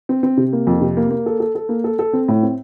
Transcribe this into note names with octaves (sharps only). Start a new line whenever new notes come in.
C4
C4
C3
A#3
F2
C3
A#3
A#3
A4
A4
A4
A#3
A4
A4
C4
A2
C4